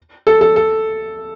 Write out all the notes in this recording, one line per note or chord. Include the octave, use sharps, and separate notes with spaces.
A4
A4
A4